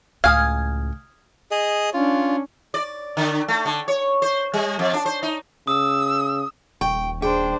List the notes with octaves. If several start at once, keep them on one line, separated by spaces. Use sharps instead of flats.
C#2 A2 F5 G#5 D#6 F6 G#6
G#4 D#5
C#4 D4 F4
D5
D3
A3
D3
C#5
C5
G3
F2
D4
C5
D#4
C#3 D#6 E6
D#1 G5 C#6
D4 G#4 C5 G5